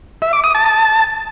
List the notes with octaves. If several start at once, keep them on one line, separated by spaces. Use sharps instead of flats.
E5
D6
D#6
A5
A5